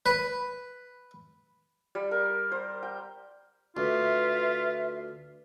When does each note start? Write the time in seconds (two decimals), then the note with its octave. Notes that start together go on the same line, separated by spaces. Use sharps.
0.06 B4
1.95 G3
2.11 A#4
2.52 C5
2.83 G5
3.77 D2 F4 B4 E5